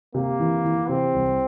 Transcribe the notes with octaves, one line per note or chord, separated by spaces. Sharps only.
C3 A#3
E3
E3
C3 C4
C2